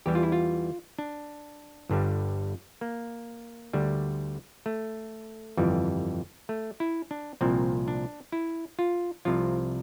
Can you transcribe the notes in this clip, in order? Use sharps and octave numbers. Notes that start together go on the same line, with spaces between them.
E2 E3 G3 G4
F4
E4
F4
D4
G1 G2 D3 G3
A#3
D2 D3 G3
A3
G1 F2 E3 G3
A3
E4
D4
C2 A#2 F3 C4
D4
E4
F4
C2 C3 F3 F4